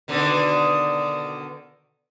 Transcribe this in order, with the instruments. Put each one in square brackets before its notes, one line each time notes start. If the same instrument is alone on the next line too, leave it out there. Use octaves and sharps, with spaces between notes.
[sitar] B2 D3 D#3